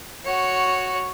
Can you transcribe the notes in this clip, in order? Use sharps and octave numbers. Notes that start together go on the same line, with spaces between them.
F#4 C#5